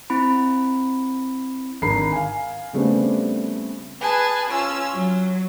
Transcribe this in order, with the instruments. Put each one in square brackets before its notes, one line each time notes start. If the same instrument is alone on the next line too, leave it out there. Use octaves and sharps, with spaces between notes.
[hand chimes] C4 E4 B5
[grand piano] G#1 D3 A#5 B5 C7
F5 G#5
C#3 G3 A3 B3 C4 D4
[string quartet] G#4 B4 A5
C#4 F4 E6
F#3